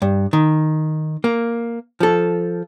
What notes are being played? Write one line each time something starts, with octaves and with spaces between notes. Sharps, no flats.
G2
D#3
A#3
F3 A4